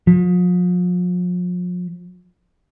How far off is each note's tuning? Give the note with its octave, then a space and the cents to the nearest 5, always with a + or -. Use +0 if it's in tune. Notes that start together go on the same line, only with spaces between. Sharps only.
F3 +40